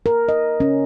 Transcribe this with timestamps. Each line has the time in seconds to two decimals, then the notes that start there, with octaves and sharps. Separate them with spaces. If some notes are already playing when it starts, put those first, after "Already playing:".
0.06 A#4
0.29 D#5
0.60 C#4